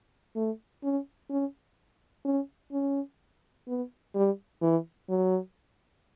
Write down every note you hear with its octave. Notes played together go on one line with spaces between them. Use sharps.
A3
C#4
C#4
C#4
C#4
B3
G3
E3
F#3